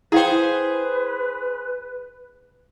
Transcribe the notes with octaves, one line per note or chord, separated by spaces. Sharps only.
E4 G#4 B4 C5 F5 G5